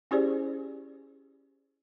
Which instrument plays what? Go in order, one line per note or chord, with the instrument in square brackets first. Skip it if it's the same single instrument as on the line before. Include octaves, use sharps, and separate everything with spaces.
[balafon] C#4 E4 G4 G#4 C5 D5